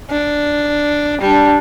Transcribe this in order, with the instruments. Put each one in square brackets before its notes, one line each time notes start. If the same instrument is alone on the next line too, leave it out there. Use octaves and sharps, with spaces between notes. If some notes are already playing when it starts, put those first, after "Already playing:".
[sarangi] D4
[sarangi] G3 [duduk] D4